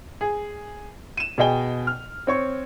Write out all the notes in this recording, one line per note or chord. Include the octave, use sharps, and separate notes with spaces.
G#4
D#7 E7
B2 G#4 D#5 G5 G7
F6
C4 C#5 C#6